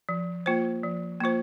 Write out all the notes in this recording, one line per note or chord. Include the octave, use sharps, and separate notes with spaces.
F3
A#3 F4 C5
F3
A#3 F4 C5